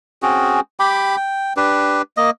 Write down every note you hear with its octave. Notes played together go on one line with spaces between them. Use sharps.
C4 C#4 F#4 G#4
G4 G5 B5 D6
G5
D4 G4 B4
A#3 D#5